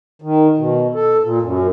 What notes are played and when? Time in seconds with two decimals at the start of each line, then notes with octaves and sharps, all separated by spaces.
0.22 D#3
0.58 B2
0.95 A4
1.23 A#2
1.42 F#2